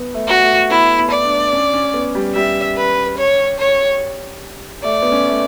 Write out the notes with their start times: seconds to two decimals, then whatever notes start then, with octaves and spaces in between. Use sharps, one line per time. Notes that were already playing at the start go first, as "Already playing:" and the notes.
Already playing: B3
0.14 A3
0.28 F#4
0.42 A3
0.70 B3 E4
0.98 B3
1.11 D5
1.25 D4
1.53 C#4
1.74 C#4
1.94 B3
2.15 G3
2.35 G3 E5
2.77 B4
3.18 C#5
3.59 C#5
4.84 A3 D5
5.02 B3
5.12 C#4
5.29 A3